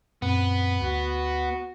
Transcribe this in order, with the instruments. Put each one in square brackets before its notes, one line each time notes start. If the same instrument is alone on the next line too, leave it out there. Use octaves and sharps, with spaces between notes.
[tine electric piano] F#2 A#2 C4 [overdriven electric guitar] B3
[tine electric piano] D2 [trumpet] F#4